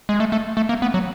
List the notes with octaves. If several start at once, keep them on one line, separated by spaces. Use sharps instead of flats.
G#3
A3
A3
A3
A#3
B3
F#3